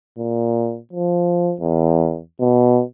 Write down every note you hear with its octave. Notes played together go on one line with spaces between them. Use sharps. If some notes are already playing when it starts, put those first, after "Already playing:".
A#2
F3
E2
B2